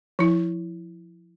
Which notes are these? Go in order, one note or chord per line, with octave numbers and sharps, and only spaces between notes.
F3 E4